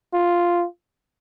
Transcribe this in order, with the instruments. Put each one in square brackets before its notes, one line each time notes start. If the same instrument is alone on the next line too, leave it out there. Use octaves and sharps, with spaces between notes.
[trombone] F4